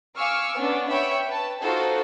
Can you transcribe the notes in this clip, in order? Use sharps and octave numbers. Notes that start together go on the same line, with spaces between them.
F5 G#5 C#6 D6 E6 F6
B3 C#4 D4
C#5 E5 G5 B5
B4 A5
D#4 F4 F#4 A4 C5